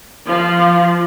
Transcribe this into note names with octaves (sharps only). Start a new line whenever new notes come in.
F3 F4